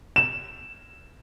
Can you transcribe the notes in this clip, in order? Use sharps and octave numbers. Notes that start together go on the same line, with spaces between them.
E7